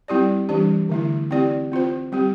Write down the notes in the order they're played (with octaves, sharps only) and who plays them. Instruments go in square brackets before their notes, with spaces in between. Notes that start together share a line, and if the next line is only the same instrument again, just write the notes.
[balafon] G3 C4 E4 G4 D5
E3 G3 D4 G4
D3 A3 E4
C4 E4 G4 D5
C4 F4 C5
G3 C4 G4